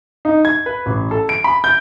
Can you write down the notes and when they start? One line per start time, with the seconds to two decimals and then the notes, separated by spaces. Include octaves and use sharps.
0.25 D#4
0.45 G#6
0.66 B4
0.86 A1
1.11 A4
1.29 D7
1.44 B5
1.64 G6